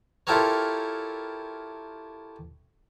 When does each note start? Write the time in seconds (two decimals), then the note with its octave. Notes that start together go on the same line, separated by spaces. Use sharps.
0.27 E4 F4 G4 A4 A#4 C#5